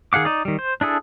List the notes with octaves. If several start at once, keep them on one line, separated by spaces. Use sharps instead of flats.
D#3 G#4 F5 F#5 D6
D#4 D5
D#3 G3
C5
D4 E4 G#4 A4